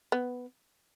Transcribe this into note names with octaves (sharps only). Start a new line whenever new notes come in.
B3